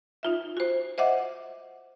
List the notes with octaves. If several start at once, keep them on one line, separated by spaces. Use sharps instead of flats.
D#4 F4 E5
F#4 C5
C5 D#5 E5 F#5 D6